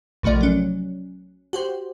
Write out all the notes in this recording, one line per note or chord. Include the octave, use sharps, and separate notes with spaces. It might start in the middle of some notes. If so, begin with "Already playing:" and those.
A#1 C3 F3 A3 D5
F#3 C#4
F#4 G4 C5